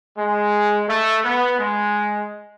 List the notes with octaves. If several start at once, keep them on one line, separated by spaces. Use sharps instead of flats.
G#3
A3
B3
G#3